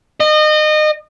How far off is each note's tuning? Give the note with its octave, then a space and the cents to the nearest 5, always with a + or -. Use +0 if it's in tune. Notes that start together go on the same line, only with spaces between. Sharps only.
D#5 -30